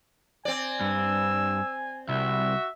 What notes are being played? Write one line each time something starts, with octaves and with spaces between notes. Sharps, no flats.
C4 D5 G#5
G2 E6
C2 F#4 E5